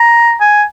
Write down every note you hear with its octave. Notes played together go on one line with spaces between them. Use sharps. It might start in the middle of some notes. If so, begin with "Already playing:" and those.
Already playing: A#5
G#5